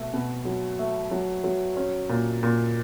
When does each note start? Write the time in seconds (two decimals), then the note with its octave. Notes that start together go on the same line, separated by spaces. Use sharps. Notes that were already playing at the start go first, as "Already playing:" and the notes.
Already playing: B2 A3
0.13 B2
0.45 F#3
0.79 A3
1.11 F#3
1.44 F#3
1.77 C#4
2.09 A#2
2.43 A#2